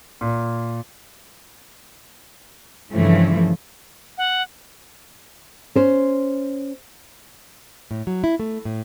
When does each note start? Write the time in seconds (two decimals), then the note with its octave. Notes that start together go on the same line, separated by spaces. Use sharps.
0.21 A#2
2.92 G2 C#3 E3 F3 A3
4.18 F#5
5.76 C#4 C5
7.91 A2
8.07 F#3
8.24 E4
8.40 A3
8.65 A2